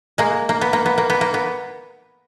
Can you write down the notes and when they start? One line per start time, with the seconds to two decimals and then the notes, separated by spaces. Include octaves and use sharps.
0.18 G#3 A#3
0.49 A#3
0.61 B3
0.73 A#3
0.86 B3
0.98 A#3
1.10 B3
1.21 A#3
1.34 B3